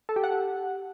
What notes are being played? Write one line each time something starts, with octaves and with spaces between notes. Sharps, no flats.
A4
G4
F#5